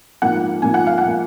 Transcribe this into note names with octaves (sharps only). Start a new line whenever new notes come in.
G#2 F3 A#3 F#5
G#2 F3 A#3 G#5
F#5
F5
F#5
F3 A#3